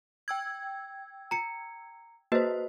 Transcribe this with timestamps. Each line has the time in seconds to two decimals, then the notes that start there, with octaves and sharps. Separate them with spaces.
0.28 G5 E6 G#6
1.31 A#5 C#7
2.32 A#3 F#4 B4 C5 D#5